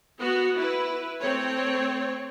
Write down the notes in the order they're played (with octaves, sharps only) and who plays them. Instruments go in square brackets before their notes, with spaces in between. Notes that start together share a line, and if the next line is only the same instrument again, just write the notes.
[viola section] B3 F#4
E4 B4
A3 C4 C#5